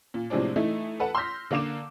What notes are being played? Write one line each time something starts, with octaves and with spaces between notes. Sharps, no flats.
A#2
A2 C3 F3 G#3 C4 D4
E3 A3 D#4 E4
A4 B4 F#5 A5
C6 E6 F6 G6 A#6 B6
D3 A#3 F5 D6 E7